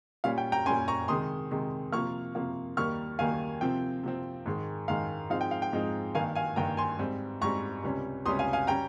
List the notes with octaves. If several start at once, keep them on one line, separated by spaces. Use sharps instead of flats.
A#2 G3 C#4 F5
G5
G5 A#5
A#2 G3 C#4 G#5 C6
A#5 C#6
C3 D#3 G#3 C6 D#6
C3 D#3 G#3
C3 F3 A#3 C#6 F6
C3 F3 A#3
D#2 D#3 G3 A#3 C#6 F6
D#2 D#3 G3 A#3 F5 G#5
C3 F3 C4 G5
C3 F3 C4
G#2 D#3 G#3
G#2 D#3 G#3 F5
G#2 F3 G#3 C4 D#4 F5
G5
F5
G5
G#2 F3 G#3 C4 D#4
G2 D#3 A#3 F5 G#5
F5 G#5
G2 D#3 A#3 G5 A#5
G#5 C6
G#2 G3 C4
G#2 G3 C4 A#5 C#6
C#2 C3 G3 C#4
C#2 C3 G3 C#4 C6 D#6
F5 G#5
F5 G#5
G3 C#4 G5 A#5